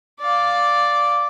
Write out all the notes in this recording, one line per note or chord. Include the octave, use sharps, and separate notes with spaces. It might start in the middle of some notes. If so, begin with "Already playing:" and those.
D5 F5